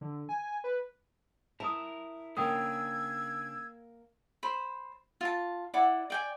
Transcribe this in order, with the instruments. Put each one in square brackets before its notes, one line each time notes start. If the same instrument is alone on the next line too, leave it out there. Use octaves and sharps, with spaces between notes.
[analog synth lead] D3
G#5
B4
[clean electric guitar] E4 A#4 [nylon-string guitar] E5 [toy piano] A5 D#6
[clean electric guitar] C#3 C#4 D4 [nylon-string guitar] A#3 [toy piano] G5 D#6 [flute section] E6 G#6
[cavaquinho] C5 B5
F4 A5
E4 D5 F#5 D6
D5 G5 G#5